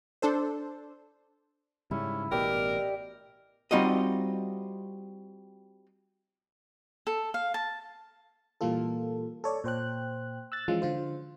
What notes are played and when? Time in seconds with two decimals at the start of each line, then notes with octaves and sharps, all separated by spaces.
0.22 D4 A4 C5
1.91 G#2 C#3 G3 C#4 E4
2.31 A1 B2 G4 A#4 D5 D#5
3.71 G3 C4 D#4 F4 F#4 D#5
7.07 A4
7.34 F5
7.54 A5
8.61 A#2 E3 G3 A#3 F4 A4
9.44 A4 C#5 D5
9.64 A#2 C5 G5 F#6
10.52 E6 F#6 A6
10.68 E3 F3 G#3 C#4 F4
10.82 D3 F4 C5